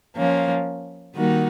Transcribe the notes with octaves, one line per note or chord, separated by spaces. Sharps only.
F3 A#3 C#4
D#3 G3 A#3 D#4 F#4